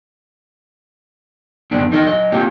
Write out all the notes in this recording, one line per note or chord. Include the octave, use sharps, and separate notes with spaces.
F#2 D3 B3 C4 D4
E2 D#4 A#4 D#5
F#3 D#5
A#3 C4 F4 G4 C#5